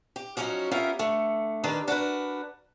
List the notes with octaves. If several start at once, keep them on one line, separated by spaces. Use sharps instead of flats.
G4
F3 F#3 C#4 D#4 F#4
B3 C#4 F4 G4 A#4 E5
D3 A3
D#3 G3 D4 B4 D5
D4 F#4 A#4 B4